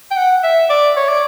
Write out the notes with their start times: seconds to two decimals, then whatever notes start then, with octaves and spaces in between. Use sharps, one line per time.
0.11 G5
0.17 F#5
0.44 E5
0.70 D5
0.97 C#5
1.09 D5